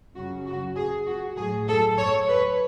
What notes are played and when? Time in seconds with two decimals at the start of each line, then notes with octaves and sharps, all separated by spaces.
0.15 F#2 C#3 F#3 F#4
0.46 F#4
0.76 G#4
1.06 F#4
1.36 A2 F#3 G#4
1.68 A4
1.98 C#5
2.28 B4